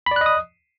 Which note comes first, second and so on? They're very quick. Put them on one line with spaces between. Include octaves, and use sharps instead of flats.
B5 D5 F#6 D#5 D#6